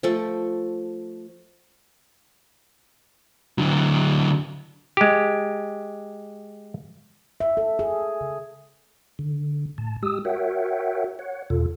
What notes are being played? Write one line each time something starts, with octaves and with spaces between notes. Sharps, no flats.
F3 A3 A4
D3 F#3
G#3 G4
E5
A4
G#4
C#3
D3
A2 A5
G#3 G4 D#6 E6
F#4 A#4 C#5 E5 F#5 G5
C#5 F#5
E2 B2 F4 A4